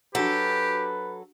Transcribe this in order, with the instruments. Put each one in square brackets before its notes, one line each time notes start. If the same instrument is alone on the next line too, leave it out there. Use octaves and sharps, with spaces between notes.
[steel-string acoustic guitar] F#3 A4 [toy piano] D4 F#4 F#5 [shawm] G4 [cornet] B4